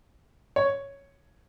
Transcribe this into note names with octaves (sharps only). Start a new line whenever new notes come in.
C#5